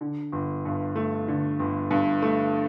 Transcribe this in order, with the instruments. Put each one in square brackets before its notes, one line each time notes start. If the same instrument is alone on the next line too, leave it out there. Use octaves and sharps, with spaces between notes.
[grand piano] D3
G1
G2
A3
D3
G1
G2
A3